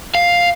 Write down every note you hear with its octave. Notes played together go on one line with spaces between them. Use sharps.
F5